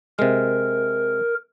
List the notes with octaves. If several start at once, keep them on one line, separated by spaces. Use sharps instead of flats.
C3 G#3 A#4